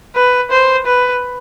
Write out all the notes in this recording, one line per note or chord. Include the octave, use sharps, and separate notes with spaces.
B4
C5
B4